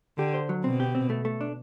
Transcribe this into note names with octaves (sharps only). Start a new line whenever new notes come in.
D3 G4
C5
F#3
B2 C4
G4
C4
A3
A3
D4